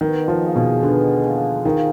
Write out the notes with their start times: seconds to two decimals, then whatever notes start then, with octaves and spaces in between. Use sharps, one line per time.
0.01 B2 D#3
0.28 F3
0.42 A#3 F4 G#4
0.56 B2
0.83 B2 D3
1.24 A#3 F4 G#4
1.65 D#3 F3